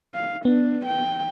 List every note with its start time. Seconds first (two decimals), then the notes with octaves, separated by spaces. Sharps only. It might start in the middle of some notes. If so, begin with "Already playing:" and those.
0.15 F5
0.45 B3 D4
0.86 G5